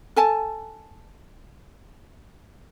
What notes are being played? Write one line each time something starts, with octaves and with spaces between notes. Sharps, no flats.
A4 G#5 A5